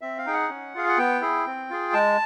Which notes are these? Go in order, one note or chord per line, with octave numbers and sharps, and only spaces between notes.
C4 E5
F5
D#4 G#4 G5
F#5
C#4
F4 G#4 F5
F#5
B3 G5
E4 G#4
C4
F4 G#4
G#3 A5